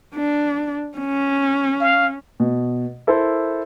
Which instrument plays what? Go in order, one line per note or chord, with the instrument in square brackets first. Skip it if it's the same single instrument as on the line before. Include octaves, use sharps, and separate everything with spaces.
[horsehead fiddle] D4
C#4
[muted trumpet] F5
[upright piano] B2
E4 A4 A#4 C5